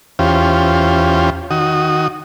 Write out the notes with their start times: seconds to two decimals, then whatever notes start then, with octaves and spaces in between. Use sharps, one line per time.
0.19 E2 C#4 F4 G4 C5
1.51 D#3 F#4 D#6